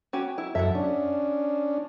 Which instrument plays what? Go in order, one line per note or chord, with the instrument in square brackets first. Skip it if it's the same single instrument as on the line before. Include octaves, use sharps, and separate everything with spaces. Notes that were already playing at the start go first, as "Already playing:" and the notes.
[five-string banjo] C#4 F#4 G4
E4
[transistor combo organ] F#2 A4 [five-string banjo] E5 F#5
[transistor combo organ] C#4 D4